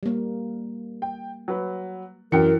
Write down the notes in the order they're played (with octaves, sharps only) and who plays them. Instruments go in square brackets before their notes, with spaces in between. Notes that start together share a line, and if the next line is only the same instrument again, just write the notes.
[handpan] G3 A#3
[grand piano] G5
F#3 B4
[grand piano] F#2 G5 C#7 [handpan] E3 [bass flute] A#4